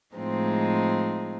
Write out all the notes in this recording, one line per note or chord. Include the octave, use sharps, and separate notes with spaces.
A2 F3 G#3 C4 D#4